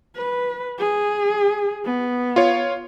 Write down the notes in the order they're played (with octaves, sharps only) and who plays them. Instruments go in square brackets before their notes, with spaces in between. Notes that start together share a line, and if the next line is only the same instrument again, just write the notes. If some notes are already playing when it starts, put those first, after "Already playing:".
[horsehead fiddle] B4
G#4
B3
[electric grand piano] F4 C#5